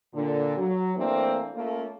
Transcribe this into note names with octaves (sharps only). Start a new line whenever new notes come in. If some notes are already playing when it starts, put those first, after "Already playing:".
A#2 D3
F#3
E3 A3 A#3 C4 D4
A3 A#3 C#4 F4